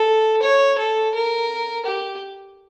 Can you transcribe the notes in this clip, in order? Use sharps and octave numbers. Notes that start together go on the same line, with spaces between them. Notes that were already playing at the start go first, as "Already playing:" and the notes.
Already playing: A4
C#5
A4
A#4
G4